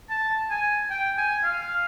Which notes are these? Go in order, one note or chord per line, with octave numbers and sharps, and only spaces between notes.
A5
G#5
G5
G#5
F5